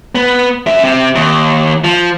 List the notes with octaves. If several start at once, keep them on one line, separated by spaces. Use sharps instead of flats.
B3
F#2 E5
C3
D#2
F3